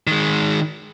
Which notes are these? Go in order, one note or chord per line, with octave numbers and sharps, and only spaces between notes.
D#3 G#3